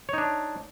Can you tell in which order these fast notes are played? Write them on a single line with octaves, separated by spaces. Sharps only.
C#5 D#4 D4